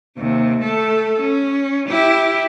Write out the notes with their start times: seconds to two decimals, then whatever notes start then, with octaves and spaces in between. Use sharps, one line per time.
0.18 D#2 C3
0.61 A3 A4
1.20 C#4
1.88 E4 G4